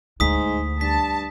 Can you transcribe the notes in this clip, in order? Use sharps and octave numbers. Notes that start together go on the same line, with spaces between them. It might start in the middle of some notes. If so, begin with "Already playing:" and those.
D2 G#2 D#6 B6
G2 A5 B6